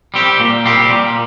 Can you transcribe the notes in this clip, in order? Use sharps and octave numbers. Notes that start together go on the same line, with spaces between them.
G3 C4 G4
A#2
G3 C4 G4
A#2